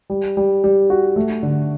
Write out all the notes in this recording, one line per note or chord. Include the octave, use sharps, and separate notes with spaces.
G3
G3
G3
F#4
A3
D3